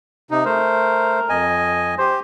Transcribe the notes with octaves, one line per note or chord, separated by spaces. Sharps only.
C3 D#4
A3 A#4 C5
F2 D#5 G#5
G4 C5